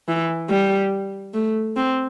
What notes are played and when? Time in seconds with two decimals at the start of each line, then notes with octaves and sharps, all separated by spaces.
0.08 E3
0.50 G3
1.34 A3
1.76 C4